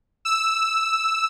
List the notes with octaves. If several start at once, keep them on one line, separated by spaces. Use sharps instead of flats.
E6